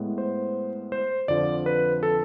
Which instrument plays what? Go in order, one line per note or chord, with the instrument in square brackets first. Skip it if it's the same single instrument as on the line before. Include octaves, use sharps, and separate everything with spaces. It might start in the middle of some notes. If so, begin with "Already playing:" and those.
Already playing: [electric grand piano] A2 G#3 B3
C5
C5
F2 D3 F3 D5
B4
A4